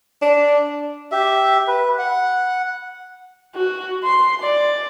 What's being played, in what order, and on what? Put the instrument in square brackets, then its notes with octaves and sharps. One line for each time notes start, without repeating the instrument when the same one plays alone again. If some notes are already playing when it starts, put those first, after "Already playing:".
[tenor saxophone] D4
[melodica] G4 E5
B4
F#5
[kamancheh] F#4
C6
D5